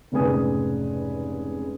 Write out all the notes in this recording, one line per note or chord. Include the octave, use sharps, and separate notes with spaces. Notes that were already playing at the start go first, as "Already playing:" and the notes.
F1 G#2 C#3 B4 G#5 D#6